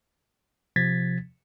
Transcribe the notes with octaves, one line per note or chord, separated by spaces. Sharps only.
C3 F3 G#6 A6 B6